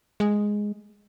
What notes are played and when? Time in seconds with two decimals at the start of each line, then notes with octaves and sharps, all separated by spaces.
0.20 G#3